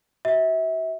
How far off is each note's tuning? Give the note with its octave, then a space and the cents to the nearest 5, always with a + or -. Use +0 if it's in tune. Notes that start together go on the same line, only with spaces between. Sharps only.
F#4 +30 E5 -30